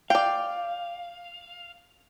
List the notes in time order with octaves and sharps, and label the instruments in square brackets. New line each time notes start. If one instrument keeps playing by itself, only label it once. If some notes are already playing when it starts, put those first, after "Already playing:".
[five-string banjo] D5 G5 [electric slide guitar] F5